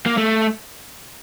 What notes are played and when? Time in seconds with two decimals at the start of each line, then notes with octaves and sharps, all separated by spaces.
0.06 A#3
0.17 A3